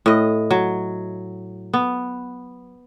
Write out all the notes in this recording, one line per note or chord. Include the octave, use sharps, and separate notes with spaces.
A2 D#5
F#3
B3